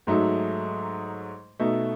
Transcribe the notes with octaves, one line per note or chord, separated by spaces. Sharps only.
G#2 F#3 A3 D#4
B2 A3 D#4